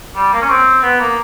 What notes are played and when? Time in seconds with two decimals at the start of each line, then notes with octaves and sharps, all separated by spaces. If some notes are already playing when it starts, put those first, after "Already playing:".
0.15 G3
0.33 A#3
0.42 C#4
0.49 C4
0.83 B3
1.00 A#3